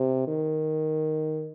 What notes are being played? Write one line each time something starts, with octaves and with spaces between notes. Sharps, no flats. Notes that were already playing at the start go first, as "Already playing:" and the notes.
Already playing: C3
D#3